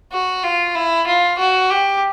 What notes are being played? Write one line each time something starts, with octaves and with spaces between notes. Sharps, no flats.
F#4
F4
E4
F4
F#4
G4